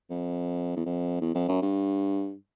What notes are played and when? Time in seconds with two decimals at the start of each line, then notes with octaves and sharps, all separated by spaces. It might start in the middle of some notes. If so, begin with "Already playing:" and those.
0.10 F2
0.76 E2
0.86 F2
1.21 E2
1.35 F2
1.48 F#2
1.62 G2